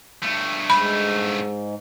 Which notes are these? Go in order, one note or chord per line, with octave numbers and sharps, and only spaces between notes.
G2 A3
G#2 B5